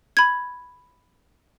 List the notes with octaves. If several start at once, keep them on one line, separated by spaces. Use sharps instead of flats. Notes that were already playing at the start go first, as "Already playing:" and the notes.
B5 G#6